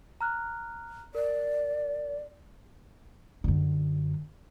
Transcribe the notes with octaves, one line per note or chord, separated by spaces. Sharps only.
A#5 F6 F#6
A#4 D5
F#2 D3